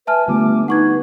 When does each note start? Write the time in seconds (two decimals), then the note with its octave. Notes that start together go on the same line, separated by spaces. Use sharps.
0.07 B4 E5 G#5 A5 F6
0.28 D3 G3 A3 B3 F4 D6
0.68 D#4 B4 F#5 C#6 G#6